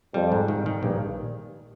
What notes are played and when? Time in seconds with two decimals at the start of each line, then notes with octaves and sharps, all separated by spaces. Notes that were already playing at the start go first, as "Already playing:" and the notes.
0.14 F2 G3
0.32 G#2
0.48 D#3
0.66 D#3
0.82 A#1 G2